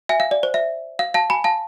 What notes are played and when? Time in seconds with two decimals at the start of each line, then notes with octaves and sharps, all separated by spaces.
0.09 E5 G#5
0.20 F5
0.31 D5
0.43 C5
0.54 E5
0.99 F5
1.14 F5 A5
1.30 G#5 B5
1.44 F5 A5